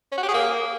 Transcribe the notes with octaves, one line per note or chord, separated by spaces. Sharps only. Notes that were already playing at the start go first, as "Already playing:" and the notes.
C#4
F#4
G4
G#4
A#3